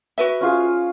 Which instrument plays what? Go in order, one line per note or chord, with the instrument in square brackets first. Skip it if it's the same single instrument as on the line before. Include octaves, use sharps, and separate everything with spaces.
[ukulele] F#4 B4 E5
[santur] C#4 F4 G#4